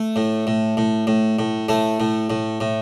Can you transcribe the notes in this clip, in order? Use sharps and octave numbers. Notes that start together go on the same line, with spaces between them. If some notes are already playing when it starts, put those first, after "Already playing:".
Already playing: A3
A2
A2
A2
A2
A2
A2 A3
A2
A2
A2